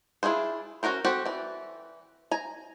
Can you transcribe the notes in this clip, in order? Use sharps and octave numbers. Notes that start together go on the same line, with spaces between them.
D4 E4 F4 G#4 C5
C#4 D#4 F#4 A#4 C5
C4 F#4 G4 A4
E3 D5
G#5 A#5